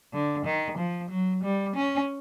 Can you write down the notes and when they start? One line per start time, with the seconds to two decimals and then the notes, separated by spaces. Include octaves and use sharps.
0.13 D3
0.45 D#3
0.78 F3
1.10 F#3
1.43 G3
1.76 C#4